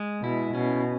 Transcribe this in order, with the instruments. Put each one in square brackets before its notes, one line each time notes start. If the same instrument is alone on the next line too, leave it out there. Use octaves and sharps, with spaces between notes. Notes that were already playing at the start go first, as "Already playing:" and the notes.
Already playing: [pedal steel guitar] G#3
[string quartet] B2 [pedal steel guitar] E4
[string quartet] B2 [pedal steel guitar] C#4